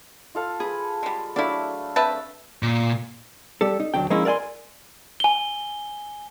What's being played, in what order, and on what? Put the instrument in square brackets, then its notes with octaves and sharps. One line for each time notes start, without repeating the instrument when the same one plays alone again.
[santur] F4 A4 F5
[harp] G#4 [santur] B4 B5
[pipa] G3 G#3
[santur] F#3 A3 F5 [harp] D4 [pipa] E4 D5
[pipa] C4 B4 A5 [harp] E5
[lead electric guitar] A#2
[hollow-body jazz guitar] G3 G4 A4
D#4
D2 F#3 D4 G5
F3 G#3 A#3 C#4 D#4 E4
A#4 D5 F5 G#5 C6
[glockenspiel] G#5 G7